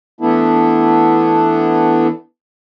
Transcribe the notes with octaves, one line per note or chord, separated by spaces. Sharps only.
E3 A3 B3 D4 E4